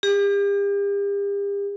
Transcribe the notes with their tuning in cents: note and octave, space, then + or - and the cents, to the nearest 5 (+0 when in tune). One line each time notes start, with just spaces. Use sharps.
G4 +40